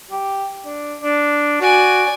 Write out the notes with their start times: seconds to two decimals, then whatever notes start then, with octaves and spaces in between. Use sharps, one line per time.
0.11 G4
0.66 D4
1.01 D4
1.61 F#4 D5 G#5